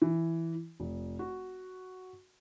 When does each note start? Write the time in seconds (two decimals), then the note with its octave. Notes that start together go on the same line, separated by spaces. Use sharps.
0.02 E3
0.80 F1
1.19 F#4